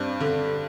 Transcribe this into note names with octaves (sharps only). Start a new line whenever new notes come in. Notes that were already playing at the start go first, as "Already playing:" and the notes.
Already playing: G2 C4 D4
D3